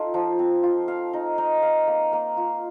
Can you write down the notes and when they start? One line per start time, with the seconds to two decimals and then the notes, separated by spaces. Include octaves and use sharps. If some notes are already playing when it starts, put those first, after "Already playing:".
Already playing: D#4 F4 A4
0.14 F3
0.39 C4
0.63 F4
0.88 F5
1.13 D#4
1.38 D#4
1.63 F5
1.88 A#3
2.13 A#3
2.37 F4